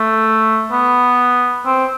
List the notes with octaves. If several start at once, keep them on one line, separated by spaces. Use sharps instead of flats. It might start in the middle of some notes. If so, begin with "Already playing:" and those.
Already playing: A3
B3
C4